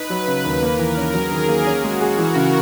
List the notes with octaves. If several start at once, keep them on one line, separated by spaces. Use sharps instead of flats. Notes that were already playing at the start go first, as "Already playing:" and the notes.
Already playing: D#4 B4
F#3
C#3
D#2
A#3 A#4
E3
C#4
F#3 G#4
D#3
A#3
C#4 F#4
G#3
G#4
E3 A#4
C#3